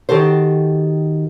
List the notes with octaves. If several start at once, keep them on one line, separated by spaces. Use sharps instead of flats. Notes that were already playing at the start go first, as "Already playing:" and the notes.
D#3 F#4 G4 A4 C5